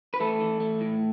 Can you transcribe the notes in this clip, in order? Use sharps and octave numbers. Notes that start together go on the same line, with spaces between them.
B4
E3 A3 A4
E3
A3
A2